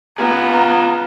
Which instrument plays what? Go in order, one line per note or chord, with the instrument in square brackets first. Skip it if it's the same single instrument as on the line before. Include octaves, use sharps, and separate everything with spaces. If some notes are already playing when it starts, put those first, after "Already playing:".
[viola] B3 [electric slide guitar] F4 G#4 [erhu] A#5